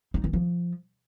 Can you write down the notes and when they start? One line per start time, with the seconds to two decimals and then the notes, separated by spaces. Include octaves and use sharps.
0.14 D#4
0.24 E3
0.33 F3